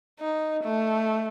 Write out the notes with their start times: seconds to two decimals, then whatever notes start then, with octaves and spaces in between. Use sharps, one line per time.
0.20 D#4
0.63 A3